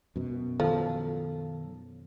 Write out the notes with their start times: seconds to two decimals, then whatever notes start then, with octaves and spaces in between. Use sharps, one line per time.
0.16 F#2 B2
0.60 D#3 F3 F#3 A4